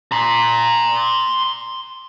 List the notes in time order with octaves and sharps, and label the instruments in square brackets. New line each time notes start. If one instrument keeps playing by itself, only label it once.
[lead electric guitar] A#5 C6